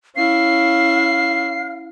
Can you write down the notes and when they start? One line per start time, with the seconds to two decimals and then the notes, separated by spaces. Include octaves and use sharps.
0.16 C#4 E4 F5 C7